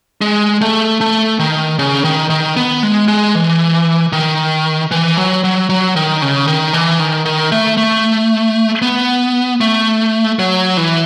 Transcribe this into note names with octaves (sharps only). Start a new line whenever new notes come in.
G#3
A3
A3
D#3
C#3
D#3
D#3
B3
G#3
G#3
E3
D#3
E3
F#3
F#3
F#3
D#3
C#3
D#3
E3
D#3
D#3
A3
A3
B3
A3
F#3
E3